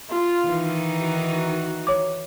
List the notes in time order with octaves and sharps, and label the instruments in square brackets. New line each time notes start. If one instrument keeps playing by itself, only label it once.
[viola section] F4
[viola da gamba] D#3 E3 D#4
[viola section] F#4
[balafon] C#5 D6